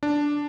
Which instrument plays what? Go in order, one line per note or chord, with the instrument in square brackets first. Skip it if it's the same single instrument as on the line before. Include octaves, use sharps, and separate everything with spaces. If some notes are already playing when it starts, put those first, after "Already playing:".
[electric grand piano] D4